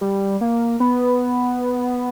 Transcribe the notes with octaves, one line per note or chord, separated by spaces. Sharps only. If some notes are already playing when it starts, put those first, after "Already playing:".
G3
A#3
B3